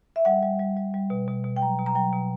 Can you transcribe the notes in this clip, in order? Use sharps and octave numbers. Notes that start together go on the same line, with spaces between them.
E5
G3 F#5
G3
G3
G3
G3
B2
B2
B2
G5
F#3 A#5
B2
A#5
F#3 G5
B2